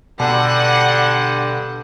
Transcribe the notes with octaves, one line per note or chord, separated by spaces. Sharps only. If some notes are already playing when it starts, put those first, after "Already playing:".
G2 B2 D3 F#5 A5